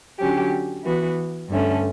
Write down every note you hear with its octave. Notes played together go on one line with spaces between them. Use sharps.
D3 F#3 C#4 G4
E3 B3 F#4
G2 D3 A3 C#4